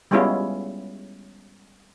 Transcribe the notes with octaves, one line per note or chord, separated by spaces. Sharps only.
G3 G#3 B3 C#4 E4 F4